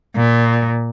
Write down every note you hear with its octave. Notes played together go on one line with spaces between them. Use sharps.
A#2